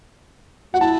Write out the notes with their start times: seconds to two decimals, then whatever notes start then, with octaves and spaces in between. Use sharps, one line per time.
0.73 F#4 F#5
0.81 E4 A5